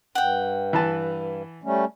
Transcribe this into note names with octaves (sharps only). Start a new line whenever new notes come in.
G2 F#5 G5
E3 B4 A5
G3 A3 C#4